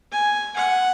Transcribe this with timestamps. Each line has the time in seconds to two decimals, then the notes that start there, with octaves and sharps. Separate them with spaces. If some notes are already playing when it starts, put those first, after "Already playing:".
0.12 G#5
0.56 F#5